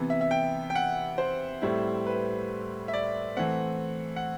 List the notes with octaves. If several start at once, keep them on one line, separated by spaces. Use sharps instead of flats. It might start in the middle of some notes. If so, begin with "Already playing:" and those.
Already playing: C3 E3 B3
E5
E5
G5
G5
F#5
C5
A2 G3 C4 E4
B4
E5
D5
E3 A3 C4 F#5
F#5